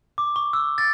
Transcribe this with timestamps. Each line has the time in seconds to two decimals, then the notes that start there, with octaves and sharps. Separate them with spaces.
0.18 D6
0.36 C#6
0.53 E6
0.78 A6